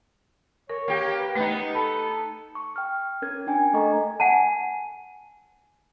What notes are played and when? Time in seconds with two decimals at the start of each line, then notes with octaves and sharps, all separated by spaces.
0.70 A#4 C#5
0.88 A#3 G4
1.18 B4
1.35 A3 B3 D#4
1.75 A4 B5
2.55 C#6
2.76 G5 F6
3.22 C#4 A#4 G#6
3.47 D4 G5 G#5 G#6
3.73 A3 A4 D#5 A#5 C#6
4.20 F#5 G#5 A5